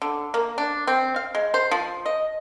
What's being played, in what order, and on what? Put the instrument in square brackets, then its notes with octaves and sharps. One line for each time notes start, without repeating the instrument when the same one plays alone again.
[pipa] D3
A#3
D4
C4
F5
G#3
C5
F3
D#5